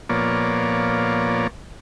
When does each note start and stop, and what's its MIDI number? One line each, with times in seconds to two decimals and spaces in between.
0.09 1.47 46
0.09 1.47 53
0.09 1.47 58
0.09 1.47 59
0.09 1.47 73
0.09 1.47 74